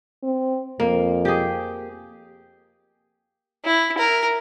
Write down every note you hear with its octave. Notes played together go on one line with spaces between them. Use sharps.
C4
F2 A#3
G4 G#4
E4
A#4